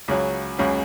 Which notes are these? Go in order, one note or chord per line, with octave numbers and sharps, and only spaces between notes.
C#2 C#3 F#3
C#2 C#3 F#3